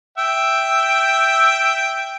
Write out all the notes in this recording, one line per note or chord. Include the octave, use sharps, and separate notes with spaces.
E5 G5